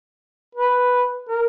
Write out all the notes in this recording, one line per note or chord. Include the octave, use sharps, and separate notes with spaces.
B4
A#4